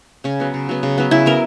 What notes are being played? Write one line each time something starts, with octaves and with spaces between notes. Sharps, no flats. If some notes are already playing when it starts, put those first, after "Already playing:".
C#3 C#4
F#3 B3
C#3
F#3 B3
C#3
F#3 B3
C#3 E4
F#3 B3 A#4